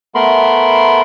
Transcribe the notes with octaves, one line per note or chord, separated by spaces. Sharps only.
A3 B3 A#4 B5 C6